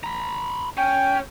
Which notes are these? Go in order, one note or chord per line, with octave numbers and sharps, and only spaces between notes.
A#5 B5
C#4 G5